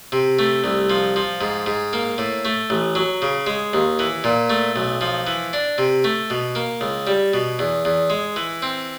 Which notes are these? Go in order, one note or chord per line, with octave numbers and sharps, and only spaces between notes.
C3
A3
C2
F3
F3
G#2
G#2
A#3
A2
A3
A1
F#3
C#3
G#3
D#2
E3
A#2
A3
B1
F3
E3
D4
C3
A3
B2
A#3
C#2
G3
B2
E2
E2
G#3
E3
C4